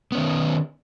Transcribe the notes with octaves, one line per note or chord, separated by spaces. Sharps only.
D#3 B3 C#4